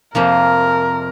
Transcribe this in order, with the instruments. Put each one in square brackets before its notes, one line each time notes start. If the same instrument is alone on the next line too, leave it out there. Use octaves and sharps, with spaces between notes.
[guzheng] F2 C3 F3 A#3 [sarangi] A#4